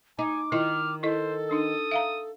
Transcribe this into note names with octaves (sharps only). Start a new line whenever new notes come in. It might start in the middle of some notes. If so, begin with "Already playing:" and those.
D#4 G#5 D6
D#3 E4 F4 F6
E4 A4 C5 D#5
D4 D#4 D#6
E5 F5 A#5